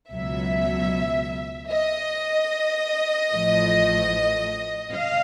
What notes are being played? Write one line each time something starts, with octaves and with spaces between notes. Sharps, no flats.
C#2 B2 F#3 E5
D#5
A1 A2 F3 A3
F5